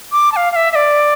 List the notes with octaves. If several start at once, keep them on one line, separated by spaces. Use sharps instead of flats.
D6
A5
F5
F5
E5
E5
D5